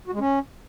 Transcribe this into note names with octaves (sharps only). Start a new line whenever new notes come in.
F#4
G#3
C#4